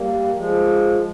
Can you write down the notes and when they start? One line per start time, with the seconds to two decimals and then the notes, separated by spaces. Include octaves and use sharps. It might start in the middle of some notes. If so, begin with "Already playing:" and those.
Already playing: G3 A#3
0.36 F3 G#3